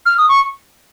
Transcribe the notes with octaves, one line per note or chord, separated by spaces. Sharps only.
F6
D#6
C#6